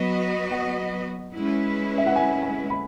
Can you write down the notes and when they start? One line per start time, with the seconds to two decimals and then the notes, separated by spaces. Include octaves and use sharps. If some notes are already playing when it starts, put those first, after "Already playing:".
Already playing: F#3 B3 F#4 B4 D#5 F#5
0.51 F#5
1.33 G#3 C#4 E4 B4
1.98 E5
2.06 F#5
2.16 G#5
2.42 G#5
2.70 B5